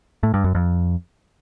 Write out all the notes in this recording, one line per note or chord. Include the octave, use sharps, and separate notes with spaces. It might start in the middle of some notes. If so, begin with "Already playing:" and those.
A2
G2
F#2
F2